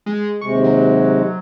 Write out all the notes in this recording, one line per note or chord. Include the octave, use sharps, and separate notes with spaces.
G#3
D#2 C3 G#3 C#6
F#3